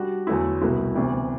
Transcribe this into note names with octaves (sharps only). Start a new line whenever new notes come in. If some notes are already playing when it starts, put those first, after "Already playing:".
Already playing: G3 D4 F#4
E2 D3 F#3 A3 E4
C2 B2 A3 E4 B4
D2 C3 E3 B3 D4